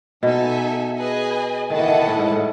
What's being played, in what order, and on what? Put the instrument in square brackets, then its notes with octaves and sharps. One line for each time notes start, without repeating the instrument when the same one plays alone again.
[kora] B2 [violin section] D#4 A4 E5 G#5
[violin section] G#4 B4 D#5 G#5
[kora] D#3 [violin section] E4 A4 D#5 F#5 A5
[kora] E3
D#3
E3
A2
G#2
A2